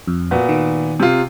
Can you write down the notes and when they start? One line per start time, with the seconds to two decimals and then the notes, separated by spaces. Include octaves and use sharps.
0.07 F2
0.31 A#2 B3 F#4
0.49 D#3
1.00 C3 F4